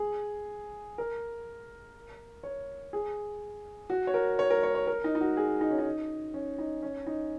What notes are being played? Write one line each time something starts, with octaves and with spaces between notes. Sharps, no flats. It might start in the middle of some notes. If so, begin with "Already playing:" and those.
Already playing: G#4
A#4
C#5
G#4
F#4
C#5
A#4
C#5
A#4
C#5
C#5
A#4
D#4
D#4
F#4
G#4
D#4
C#4
D#4
C#4
D#4
C#4
D#4